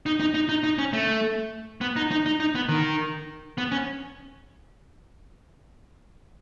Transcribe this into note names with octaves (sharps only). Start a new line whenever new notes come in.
D#4
D#4
D#4
D#4
D#4
C#4
A3
B3
D#4
D#4
D#4
D#4
B3
D#3
B3
C#4